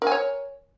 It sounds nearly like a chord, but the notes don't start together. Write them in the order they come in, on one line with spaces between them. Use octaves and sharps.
A#4 G#5 C#5